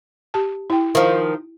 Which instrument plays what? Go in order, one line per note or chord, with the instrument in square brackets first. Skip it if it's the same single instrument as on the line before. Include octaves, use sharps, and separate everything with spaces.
[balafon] G4 A5
E4 G5
[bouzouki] D#3 F3